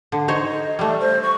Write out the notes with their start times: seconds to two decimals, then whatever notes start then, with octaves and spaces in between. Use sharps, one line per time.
0.12 D3
0.28 D#4 C5 C#5
0.47 D#5
0.79 G3 A3 D5
1.00 C5
1.23 C#6